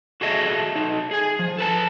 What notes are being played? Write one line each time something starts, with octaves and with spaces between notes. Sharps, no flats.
F#4 G#4 A4 D#5 E5
D#4 A4
G#4 G#5
F3
A4 B4 A5